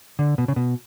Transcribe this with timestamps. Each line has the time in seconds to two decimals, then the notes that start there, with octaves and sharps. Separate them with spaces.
0.19 D3
0.38 B2
0.48 C#3
0.56 B2